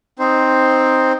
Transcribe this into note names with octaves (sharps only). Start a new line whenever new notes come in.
C4 D#4 C5